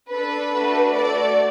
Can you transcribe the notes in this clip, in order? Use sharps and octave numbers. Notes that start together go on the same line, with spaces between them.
D4 A4 B4
A3 D4 F#4 A4
A3 F#4 A4 D5